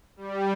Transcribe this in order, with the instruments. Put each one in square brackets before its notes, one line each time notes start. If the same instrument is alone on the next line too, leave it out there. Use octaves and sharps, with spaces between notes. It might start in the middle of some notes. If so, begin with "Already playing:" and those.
[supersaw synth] G3